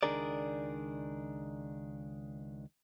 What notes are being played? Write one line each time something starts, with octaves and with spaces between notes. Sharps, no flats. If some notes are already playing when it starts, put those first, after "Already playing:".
C#2 D#3 D4 G#4 A#4 D5